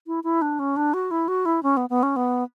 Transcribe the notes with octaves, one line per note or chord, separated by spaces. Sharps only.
E4
E4
D4
C#4
D4
F#4
E4
F#4
E4
C#4
B3
B3
C#4
B3